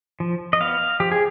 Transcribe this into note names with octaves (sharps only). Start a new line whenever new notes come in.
F3
D#5
B3 F5
F3 G4
G#4